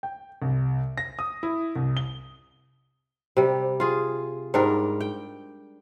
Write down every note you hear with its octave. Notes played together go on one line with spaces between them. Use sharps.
G5
C2
A#6
D#6
E4
C2
G7
C3 G3
F4 G#4
G#2 G3 D4 A#4
G5